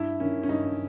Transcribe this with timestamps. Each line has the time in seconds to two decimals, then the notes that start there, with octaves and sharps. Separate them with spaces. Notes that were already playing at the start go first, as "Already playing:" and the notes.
Already playing: G2 E4
0.20 D#3 C#4
0.43 C#4
0.49 G2 D#4